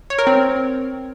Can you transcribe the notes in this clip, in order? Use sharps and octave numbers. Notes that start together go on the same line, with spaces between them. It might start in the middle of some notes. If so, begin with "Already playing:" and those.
C#5
A#4
C4